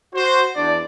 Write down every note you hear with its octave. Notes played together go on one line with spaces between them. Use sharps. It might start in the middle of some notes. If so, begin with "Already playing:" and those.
F#4 C5
E2 D4 D5